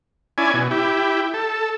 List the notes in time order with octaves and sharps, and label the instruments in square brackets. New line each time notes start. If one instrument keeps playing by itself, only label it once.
[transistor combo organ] C#4 E4 D5 G#5
B2
E4 G4
A4